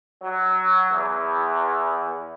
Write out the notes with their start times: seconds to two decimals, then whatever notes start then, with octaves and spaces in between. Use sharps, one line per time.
0.23 F#3
0.91 E2